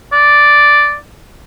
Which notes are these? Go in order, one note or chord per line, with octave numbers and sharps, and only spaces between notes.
D5